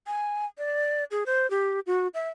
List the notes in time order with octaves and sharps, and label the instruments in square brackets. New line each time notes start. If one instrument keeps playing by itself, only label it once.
[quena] G#5
D5
G#4
C5
G4
F#4
E5